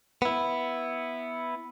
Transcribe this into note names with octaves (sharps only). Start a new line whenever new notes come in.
B3 E4